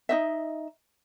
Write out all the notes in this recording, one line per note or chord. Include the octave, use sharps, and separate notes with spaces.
D#4 D#5 E5